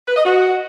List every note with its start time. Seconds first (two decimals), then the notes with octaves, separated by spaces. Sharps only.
0.08 B4
0.17 D#5
0.25 F#4